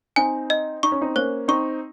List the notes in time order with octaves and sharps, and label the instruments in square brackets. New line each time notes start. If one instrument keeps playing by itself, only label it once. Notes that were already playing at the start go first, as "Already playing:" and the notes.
[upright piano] C4 D#4 [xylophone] G#5
[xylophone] D#5
[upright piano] D#4 [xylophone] C#6
[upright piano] C#4
C4 D#4
[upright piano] A#3 C#4 [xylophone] C5
[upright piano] C4 D#4 [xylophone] C#6